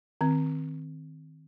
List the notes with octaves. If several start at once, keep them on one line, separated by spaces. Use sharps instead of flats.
D#3 C4